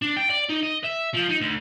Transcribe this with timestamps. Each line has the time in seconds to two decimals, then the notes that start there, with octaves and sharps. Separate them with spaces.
0.02 D4
0.17 G5
0.30 D5
0.50 D#4
0.63 D#5
0.84 E5
1.14 F3
1.30 D#4
1.41 D2